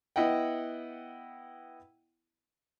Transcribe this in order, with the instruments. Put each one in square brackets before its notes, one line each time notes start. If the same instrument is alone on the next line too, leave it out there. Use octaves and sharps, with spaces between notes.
[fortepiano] B3 E4 D#5 F#5 G5